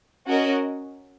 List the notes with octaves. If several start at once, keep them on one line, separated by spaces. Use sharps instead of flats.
C#4 F#4 A#4 D#5